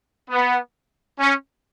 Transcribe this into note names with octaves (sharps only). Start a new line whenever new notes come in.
B3
C#4